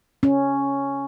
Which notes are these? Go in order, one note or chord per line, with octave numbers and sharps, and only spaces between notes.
C#4